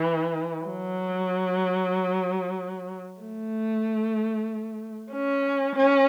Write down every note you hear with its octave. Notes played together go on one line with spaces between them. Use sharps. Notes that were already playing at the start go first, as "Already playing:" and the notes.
Already playing: E3
F#3
A3
C#4
C#4